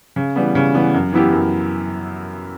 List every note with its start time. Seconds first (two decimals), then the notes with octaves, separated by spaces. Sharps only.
0.16 C#3
0.36 E3 G3 B3
0.55 C#3
0.74 E3 G3 B3
0.94 F#2
1.13 E3 B3 E4 G4
1.32 F#2